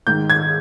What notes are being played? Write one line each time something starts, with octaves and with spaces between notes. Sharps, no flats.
G#2 D#3 G6
G#6